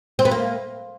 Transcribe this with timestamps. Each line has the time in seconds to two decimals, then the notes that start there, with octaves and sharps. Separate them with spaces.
0.19 C4
0.25 B3
0.31 A#3